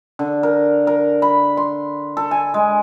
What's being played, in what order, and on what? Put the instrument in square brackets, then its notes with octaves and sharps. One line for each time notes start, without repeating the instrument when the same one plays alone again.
[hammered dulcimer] D3
A#4
A#4
B5
C6
A4
G#5
G#3